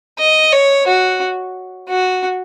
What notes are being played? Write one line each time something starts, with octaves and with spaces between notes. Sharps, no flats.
D#5
C#5
F#4
F#4